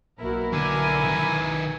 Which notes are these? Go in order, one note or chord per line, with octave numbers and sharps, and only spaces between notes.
B1 A#3 E4 F#4 A#4
D3 G#5
D#3 B4